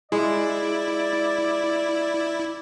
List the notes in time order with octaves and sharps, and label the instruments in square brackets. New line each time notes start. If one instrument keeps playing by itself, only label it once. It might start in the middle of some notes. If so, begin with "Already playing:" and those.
[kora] G#3 [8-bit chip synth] E4 [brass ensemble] D5